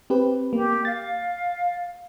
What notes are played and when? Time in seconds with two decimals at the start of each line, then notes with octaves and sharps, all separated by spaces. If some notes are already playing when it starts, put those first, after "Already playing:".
0.10 C4 G4 B4
0.53 A#3 G4
0.85 F5 A6